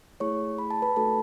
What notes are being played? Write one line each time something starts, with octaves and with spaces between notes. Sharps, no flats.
A3 E4 G#4 C#5 C#6
B5
A5
B4 B5
A3 D#4 F#4 A4 A5